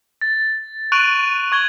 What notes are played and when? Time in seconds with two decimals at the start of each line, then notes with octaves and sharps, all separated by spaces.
0.21 A6
0.92 C#6 F#6 D7 D#7 F7 F#7
1.52 C#6 G#6 F#7 G7